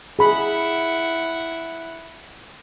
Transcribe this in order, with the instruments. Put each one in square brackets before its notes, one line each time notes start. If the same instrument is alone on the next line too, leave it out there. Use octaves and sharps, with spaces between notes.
[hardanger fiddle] E4 F#5 [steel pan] G#4 B5